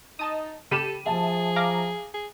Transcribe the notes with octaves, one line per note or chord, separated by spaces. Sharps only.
D#4 D#5 A5 D#6
C#3 G4 A4 B5 D#7 E7
F3 G#4 E5 A5
F5 A#5 D6
G#4